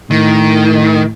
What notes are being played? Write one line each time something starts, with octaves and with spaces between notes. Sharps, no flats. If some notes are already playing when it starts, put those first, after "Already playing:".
A2 D#3